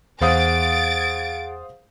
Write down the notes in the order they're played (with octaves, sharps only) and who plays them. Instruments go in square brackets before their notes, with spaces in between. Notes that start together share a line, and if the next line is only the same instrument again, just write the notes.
[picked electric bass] E2 [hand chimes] G#4 F#5 [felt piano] C5 F5 D#6 [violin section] A6 D7